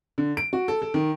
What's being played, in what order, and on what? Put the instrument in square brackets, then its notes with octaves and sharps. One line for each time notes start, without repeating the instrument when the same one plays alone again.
[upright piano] D3
D7
F#4
A4
A4
D#3